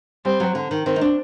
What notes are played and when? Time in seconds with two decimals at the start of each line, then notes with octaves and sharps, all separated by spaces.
0.25 G3 C4
0.40 F#3
0.55 D3
0.71 D#3
0.86 D#3 C4
0.96 D#4
1.01 D4